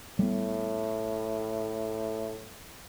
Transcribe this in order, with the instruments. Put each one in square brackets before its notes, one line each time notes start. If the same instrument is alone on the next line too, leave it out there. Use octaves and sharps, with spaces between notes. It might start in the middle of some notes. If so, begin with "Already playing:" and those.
[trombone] A2 [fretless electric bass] G3 B3